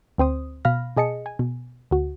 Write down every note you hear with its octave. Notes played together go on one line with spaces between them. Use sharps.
D2 C4 C5 D#6
B2 F5 B5 F6 A#6
B2 G#4 D#5 A5 C#7
G#5
B2
D2 F#4